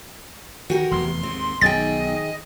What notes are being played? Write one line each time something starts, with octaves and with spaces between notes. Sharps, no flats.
D#3 F#4 G4 A#4
F1 E2 E3 C6
D#2 G#2 C4
B1 D#3 G#4 D#5 G5 A6